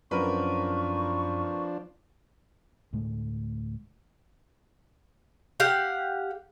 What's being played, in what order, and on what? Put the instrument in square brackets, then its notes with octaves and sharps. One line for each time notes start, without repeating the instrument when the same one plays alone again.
[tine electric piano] F#2 [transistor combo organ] F3 D4 [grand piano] C4 A#4 B4 [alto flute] C#6
[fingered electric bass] D2 A2 G#3 A3
[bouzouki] G4 F5 F#5